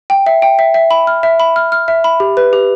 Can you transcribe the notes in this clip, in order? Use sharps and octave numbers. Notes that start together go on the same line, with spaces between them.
G5
E5
G5
E5
E5
B5
F6
E5
B5
F6
F6
E5
B5
G4
B4
G4